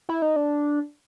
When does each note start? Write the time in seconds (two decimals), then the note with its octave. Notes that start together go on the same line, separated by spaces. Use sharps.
0.09 E4
0.22 D#4
0.36 D4